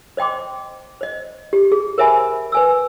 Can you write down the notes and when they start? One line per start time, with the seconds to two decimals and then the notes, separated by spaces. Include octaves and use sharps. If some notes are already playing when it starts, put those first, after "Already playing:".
0.17 C5 D#5 G5 C6 D6
1.01 C5 D#5
1.53 G4
1.72 G#4
1.98 A#4 C5 E5 G#5 B5
2.52 B4 G#5 E6